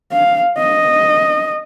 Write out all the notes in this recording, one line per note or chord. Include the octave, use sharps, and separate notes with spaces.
F5
D#5